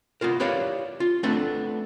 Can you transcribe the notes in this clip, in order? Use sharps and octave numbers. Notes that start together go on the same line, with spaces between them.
B3 E4 F4 A#4
E4 G4 B4 C#5 D5 F5
F4
A3 B3 C4 D4 A4 B4